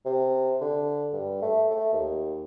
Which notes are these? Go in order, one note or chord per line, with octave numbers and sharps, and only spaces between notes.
C3
D3
G2
A3
A3
D#2